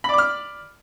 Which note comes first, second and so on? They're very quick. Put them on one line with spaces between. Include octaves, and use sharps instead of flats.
B5 D5 D6 F6